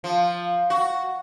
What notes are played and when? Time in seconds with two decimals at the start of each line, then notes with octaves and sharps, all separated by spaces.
0.04 F3
0.70 F#4